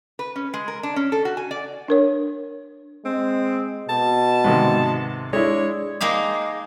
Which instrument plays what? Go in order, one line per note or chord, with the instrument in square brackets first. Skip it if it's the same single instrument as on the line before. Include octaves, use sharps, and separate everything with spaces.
[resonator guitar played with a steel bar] B4
C#4
G#3
A#4
D4
C#4
A4
F#4
G#5
D5
[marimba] D4 A#4 C#5
[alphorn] G#3 [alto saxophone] C4
[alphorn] B2 [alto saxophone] A5
[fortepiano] G#2 C3 D#3
[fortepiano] G#3 E4 [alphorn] D4 [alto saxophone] C#5
[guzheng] G#3 A#3 D#4 G4